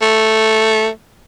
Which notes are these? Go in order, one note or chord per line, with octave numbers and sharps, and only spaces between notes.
A3